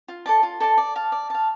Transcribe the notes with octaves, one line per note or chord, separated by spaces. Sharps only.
F4
A4 D5 A5
F4
A4 D5 A5
D5
F5 A5
D5
F5 A5